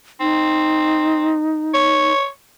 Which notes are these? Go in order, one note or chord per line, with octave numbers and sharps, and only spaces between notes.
C4 D#4
C#5